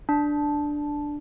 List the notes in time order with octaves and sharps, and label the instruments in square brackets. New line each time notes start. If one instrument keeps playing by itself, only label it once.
[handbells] D4